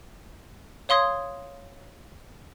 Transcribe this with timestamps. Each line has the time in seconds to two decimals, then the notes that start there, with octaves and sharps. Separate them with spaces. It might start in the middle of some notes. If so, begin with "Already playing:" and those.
0.89 C#5 F5 C6 D#6 G#6